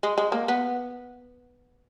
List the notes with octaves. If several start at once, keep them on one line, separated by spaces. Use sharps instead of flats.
G#3
G#3
A#3
B3